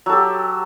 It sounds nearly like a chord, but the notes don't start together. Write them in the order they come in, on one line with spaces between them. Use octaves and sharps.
F#3 A4 G4